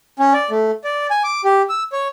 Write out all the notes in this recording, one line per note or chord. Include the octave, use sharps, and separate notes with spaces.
C#4
D5
A3
D5
G#5
D6
G4
E6
C#5